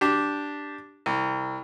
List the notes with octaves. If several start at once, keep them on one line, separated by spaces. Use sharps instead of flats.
D4 G4
C2